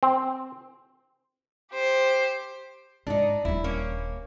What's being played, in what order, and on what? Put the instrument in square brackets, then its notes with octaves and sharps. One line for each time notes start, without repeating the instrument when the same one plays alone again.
[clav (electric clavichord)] C4
[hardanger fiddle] G4 C5
[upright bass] G#2 G#3 [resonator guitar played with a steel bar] D4 D#4
[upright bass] D#1 G3 [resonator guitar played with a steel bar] E4
[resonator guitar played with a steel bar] A#3 C#4